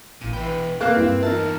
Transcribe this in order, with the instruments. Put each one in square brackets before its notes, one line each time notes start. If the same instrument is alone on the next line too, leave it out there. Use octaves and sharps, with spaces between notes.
[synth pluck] A1 D#7 [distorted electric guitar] A#2
[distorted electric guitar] B2 G5 [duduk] E3 [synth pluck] B5
[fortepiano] A#3 F5 F#6 [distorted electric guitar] C4 [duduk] B4
[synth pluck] G2 G3 E4
[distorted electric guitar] E2 A5 [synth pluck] D#4 F4 E5 [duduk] A#4